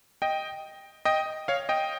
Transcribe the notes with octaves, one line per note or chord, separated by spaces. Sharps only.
D#5 G5
D#5 G5
C#5 F5
D#5 G5